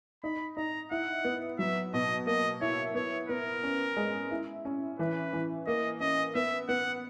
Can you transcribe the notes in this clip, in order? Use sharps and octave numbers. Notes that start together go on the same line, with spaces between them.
D#4 B5
D#4 A#5
E4 F#5
B3
F#3 E5
B2 D#5
A#3 D#5
E4 C#5
B3 C#5
B3 A#4
C#4
G#3
E4
C#4
E3 B4
E3
A#3 D#5
C#4 D#5
B3 E5
B3 F#5